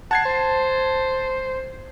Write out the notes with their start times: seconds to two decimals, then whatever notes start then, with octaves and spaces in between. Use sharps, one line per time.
0.11 F#5 A5 G#6 C7
0.25 C5